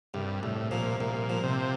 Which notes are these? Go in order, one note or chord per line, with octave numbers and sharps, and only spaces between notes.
C2 G2
C2 A2
A#2 F3
C2 A#2
F3
C3